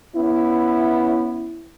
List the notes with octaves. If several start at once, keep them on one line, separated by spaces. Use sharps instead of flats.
B3 C#4 E4